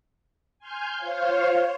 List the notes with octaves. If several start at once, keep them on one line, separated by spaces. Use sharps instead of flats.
G#5 C6 F6 G6
F4 C5 C#5 F5